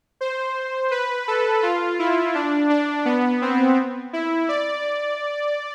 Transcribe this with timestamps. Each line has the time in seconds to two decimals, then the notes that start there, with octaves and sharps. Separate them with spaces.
0.21 C5
0.91 B4
1.28 A4
1.63 F4
1.99 E4
2.35 D4
2.70 D4
3.05 B3
3.42 C4
4.13 E4
4.49 D5